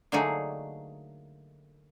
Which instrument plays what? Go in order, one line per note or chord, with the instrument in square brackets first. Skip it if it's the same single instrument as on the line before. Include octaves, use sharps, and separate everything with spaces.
[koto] D3 F#3 A3 A#3 D#4 G#4